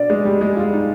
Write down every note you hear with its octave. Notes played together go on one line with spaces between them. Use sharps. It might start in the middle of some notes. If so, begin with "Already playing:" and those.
Already playing: B2 D4 D5
G#3 G#4
G3 G4
G#3 G#4
F4
D#4